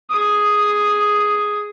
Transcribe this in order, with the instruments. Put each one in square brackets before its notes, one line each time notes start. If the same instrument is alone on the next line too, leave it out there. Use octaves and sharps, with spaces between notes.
[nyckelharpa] G#4 D#6